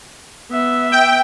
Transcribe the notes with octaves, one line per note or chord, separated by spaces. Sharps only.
B3 E5
G5